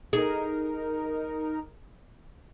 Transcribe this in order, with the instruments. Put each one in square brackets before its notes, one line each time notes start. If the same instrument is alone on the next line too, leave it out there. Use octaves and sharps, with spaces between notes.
[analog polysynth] D#4 A#4 [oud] G#4